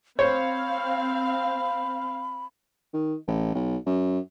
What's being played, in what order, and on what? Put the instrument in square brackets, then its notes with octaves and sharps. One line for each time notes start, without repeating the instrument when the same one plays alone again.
[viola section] C4 F5 [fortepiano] C5 C#5 [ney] B5
[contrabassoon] D#3
A1
B1
F#2